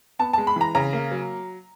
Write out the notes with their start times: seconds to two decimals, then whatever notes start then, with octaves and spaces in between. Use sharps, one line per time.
0.19 B3 A5
0.33 G#3 A5
0.47 B5
0.56 E3 A#5
0.75 C#3 A#5
0.93 A#3
1.11 F#3